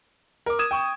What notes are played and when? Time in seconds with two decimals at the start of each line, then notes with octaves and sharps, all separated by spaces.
0.46 A#4 D6
0.59 D#6 G#6 E7
0.71 G5 C#6